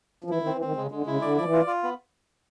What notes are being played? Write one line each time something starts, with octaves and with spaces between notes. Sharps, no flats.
F3
E3 E4
D#3
C4
E3
D#3 C4
C#3 G#3
D3 G#3
C#3 E4
D3 D5
F3 D5
E3
F4
F4
B3